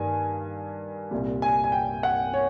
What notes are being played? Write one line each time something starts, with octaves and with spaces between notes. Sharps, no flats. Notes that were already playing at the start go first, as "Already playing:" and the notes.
Already playing: G2 D#3 G3 A#3 G#5
C2 A#2 G3
G#5
G#5
G5
F#5
C#5